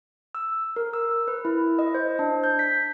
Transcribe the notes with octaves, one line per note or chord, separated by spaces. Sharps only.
E6
A#4
E6
B4
E4
D#5
C5
D4
G6
B6